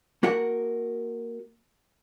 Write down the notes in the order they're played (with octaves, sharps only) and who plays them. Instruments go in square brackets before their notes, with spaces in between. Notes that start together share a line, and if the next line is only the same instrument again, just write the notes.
[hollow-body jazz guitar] A#3 F#4 A#4 F#5